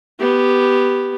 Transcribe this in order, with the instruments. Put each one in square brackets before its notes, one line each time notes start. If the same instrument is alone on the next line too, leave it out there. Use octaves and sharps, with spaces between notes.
[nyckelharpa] B3 G4